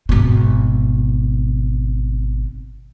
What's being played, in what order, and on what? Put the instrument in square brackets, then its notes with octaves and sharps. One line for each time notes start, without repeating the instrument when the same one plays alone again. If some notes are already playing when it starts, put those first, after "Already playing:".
[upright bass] G#1 B2